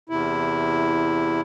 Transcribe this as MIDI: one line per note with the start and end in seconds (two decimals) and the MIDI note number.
0.09 1.41 40
0.09 1.41 48
0.09 1.41 64